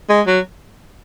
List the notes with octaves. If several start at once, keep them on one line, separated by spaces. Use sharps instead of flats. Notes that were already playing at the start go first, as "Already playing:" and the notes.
G#3
F#3